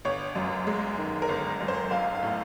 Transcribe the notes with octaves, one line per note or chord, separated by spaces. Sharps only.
G1 C#5
F#2
G#3
D#3
A#4
G1
F#2
C5
B1 F5
F5
A2